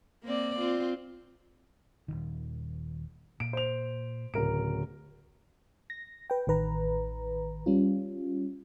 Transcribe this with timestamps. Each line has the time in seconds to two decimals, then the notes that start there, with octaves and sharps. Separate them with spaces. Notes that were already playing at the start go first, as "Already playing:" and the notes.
0.23 A#3 C4 D5
0.59 C4 F4
2.08 D#1 B1 D#3
3.40 A#2 D7
3.53 C5 F7
4.34 D1 A2 C#3 A#4 D7
5.90 A#6
6.30 B4 G5
6.47 A1 D#3 B4 A#5
7.66 G3 C#4 F4